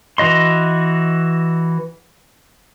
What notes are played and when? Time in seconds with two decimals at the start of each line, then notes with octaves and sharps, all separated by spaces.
0.18 E3 F#4 D#5 C6